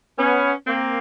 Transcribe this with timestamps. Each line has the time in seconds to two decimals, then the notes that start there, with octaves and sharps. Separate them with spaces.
0.17 B3 C#4
0.66 A#3 C4